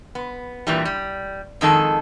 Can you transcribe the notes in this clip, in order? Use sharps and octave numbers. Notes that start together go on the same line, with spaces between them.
B3
A#2 E3 G3
G3
F2 D#3 G#3 A4